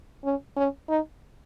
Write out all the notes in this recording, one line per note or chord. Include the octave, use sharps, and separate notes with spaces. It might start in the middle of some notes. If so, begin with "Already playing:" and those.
C#4
C#4
D#4